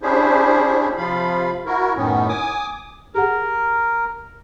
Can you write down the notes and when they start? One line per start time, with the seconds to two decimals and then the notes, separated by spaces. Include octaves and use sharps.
0.02 C#4 D4 E4 G4 G#4 C5
0.97 C3 F3 F4 F5 B5
1.66 E4 F#4 A#4
1.96 F#2 A2 D#3 B3 C#4
2.28 G#5 D6 D#6
3.14 G4 G#4 A#4 F#5